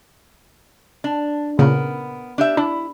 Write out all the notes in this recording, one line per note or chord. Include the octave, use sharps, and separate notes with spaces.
D4
A#2 C#3 B3 A#4
D4 G4 E5
D4 E4